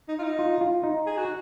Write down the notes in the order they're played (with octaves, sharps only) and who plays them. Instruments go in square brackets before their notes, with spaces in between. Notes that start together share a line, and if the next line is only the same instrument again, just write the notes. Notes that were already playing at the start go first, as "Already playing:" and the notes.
[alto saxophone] D#4
F4
D#4
[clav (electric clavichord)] F4
F4
D#4
[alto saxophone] G#4
F#4